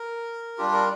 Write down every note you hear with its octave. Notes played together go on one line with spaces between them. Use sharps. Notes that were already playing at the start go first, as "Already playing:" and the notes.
Already playing: A#4
G3 D4 F4 G4
A#4